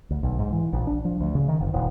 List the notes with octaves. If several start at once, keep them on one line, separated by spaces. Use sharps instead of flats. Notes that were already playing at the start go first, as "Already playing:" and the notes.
D2
B1
G#2
E3
A#1
D4
F3
D2
C#3
D#3
F#1
D#1